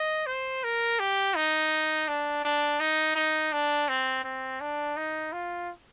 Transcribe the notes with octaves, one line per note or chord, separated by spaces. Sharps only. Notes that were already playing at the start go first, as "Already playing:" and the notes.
Already playing: D#5
C5
A#4
G4
D#4
D4
D4
D#4
D#4
D4
C4
C4
D4
D#4
F4